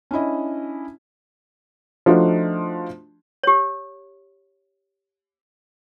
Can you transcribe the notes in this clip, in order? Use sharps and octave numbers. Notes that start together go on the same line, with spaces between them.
C#4 D4 E4 D#5
F3 A3 D4 D#4 F4 F#4
G4 C#5